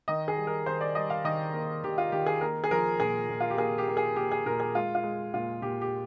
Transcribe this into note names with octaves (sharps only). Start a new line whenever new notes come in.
D#3 D#5
G#4
G3
A#4
D#3 C5
D5
G3 D#5
F5
D#3 D#5
A#3
D#3 G4
F4
D#3 G4
G#4
A#3 A#4
G#4
F3 A#4
A#2 G#4
A#2
F4
G4
A#3 G#4
G4
A#3
G#4
A#3 G4
G#4
A#2 A#4
G#4
G#3 F4
F4
G#3
A#2 F4
A#2 G4
G4